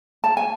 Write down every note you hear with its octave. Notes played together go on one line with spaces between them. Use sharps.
A5
G#5